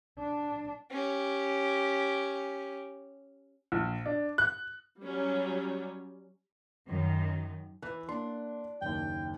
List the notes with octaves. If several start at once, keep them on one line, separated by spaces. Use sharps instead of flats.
D4
C#4 G4
A#1
D4
F#6
F#3 G3 C#4
F#2 D#3
E3 B4 F#6
A#3 D4 C6
F#1 D#2 G5